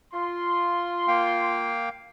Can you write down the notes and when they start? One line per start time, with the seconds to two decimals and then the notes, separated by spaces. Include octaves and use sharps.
0.14 F4 C6
1.08 A#3 F5 G5